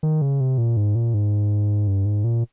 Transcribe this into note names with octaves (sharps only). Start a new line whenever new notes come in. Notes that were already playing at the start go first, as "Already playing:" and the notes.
D#3
C#3
C3
A#2
G#2
A#2
G#2
G2
G#2
A#2